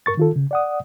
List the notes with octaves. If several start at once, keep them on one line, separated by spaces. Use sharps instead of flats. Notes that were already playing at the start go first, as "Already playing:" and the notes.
G2 A#4 C#6 A6
D#3 F4 A4
C#3
D5 F#5 D#6